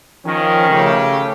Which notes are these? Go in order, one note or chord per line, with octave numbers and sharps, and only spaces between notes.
D#3 F3 C#4
C#3 A3 G4